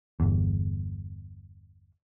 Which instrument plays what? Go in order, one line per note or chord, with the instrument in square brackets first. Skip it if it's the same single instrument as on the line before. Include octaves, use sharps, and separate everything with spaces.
[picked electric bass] G1 E2